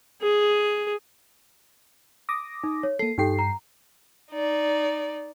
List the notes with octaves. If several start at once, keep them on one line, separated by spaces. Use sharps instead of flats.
G#4
D6 D#6 A#6
D#4
C#5
A#3 A4 C7
G2 D#4 G4 A4 G5 C7
A#5
D#4 D5